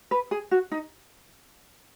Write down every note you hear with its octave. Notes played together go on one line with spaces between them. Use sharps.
B4
G#4
F#4
D#4